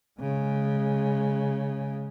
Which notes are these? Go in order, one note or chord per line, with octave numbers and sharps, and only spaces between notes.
C#3 G#3